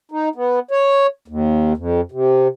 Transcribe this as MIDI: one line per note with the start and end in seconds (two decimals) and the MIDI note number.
0.12 0.29 63
0.35 0.59 59
0.71 1.07 73
1.28 1.73 39
1.77 2.01 41
2.12 2.48 48